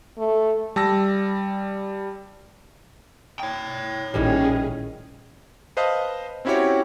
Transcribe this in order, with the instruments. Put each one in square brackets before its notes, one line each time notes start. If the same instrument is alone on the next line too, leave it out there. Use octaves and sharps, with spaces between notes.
[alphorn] A3
[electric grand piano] G3 A5 E6 A#6
[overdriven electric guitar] C#5 G5
[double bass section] A#1 [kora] A2 D#3 G3 [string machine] C#4 G#4
[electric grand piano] B4 C5 D#5 F5 A5 D#6
C4 C#4 E4 F#4 G4 C#5